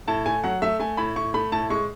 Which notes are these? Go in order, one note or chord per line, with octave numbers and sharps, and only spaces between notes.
A2 A5
A3 G#5
F#3 F#5
A3 E5
A3 G#5
A2 B5
A2 C#6
A3 B5
A2 A5
G#3 C#6